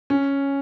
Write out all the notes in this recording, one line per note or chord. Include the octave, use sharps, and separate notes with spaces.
C#4